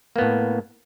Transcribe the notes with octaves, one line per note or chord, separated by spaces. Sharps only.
A2 A#3 B3